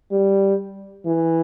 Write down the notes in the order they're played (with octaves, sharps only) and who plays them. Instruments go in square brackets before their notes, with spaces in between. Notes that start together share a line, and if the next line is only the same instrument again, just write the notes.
[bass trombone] G3
E3